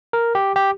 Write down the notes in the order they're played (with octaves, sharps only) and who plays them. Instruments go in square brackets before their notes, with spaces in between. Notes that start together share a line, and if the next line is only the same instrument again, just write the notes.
[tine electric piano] A#4
G4
G4